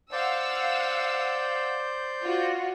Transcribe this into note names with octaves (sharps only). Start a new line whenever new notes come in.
C5 D5 F5 F#5 E6 G6
F4 F#4